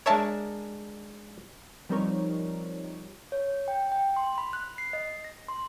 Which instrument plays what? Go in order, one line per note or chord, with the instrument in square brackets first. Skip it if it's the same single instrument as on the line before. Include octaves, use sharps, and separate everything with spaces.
[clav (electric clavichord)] G#3 D4 A#4 [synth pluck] C#5 E5 A5
[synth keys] F3 G3 C4 D#4 A#4 C#5
[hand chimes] C#5
G5
G5
C6
B5
F#6
C7
D#5
A#6
C6